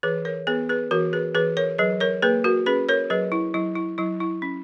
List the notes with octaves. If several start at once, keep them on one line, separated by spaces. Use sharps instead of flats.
E3 G#4 B4
A#4 C#5
B3 G#4 B4
G#4 B4
E3 F#4 A#4
G#4 B4
E3 G#4 B4
A#4 C#5
F#3 G#4 B4
A#4 C#5
A#3 G#4 B4
F#4 A#4
C#4 G#4 B4
A#4 C#5
F#3 G#4 B4
E4
F#3 E4
E4
F#3 E4
E4
C#4